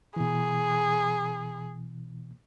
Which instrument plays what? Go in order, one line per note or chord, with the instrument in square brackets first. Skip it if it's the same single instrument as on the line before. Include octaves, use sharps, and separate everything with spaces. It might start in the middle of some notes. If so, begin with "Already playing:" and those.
[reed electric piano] B2 E3 [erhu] G#4